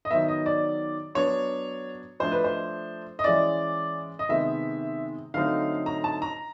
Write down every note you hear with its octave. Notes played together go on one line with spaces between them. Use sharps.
D#5
D#3 F#3 B3 E5
D#5
D5
F#3 B3 D4 C#5
F3 A3 D4 C5
B4
C5
D#5
E3 G#3 C#4 E4 D5
D#5
C3 D#3 G#3 B3 E5
D3 F#3 A3 C4 D#4 F5
A#5
A5
A#5